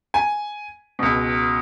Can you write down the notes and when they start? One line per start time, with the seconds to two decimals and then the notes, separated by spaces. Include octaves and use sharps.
0.14 G#5
0.99 C#2 B2